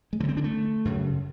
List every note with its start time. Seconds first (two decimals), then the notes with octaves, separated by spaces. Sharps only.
0.13 G#3
0.20 D3 A3
0.23 G2
0.29 C4
0.37 D4
0.44 A3
0.85 F#2 C#3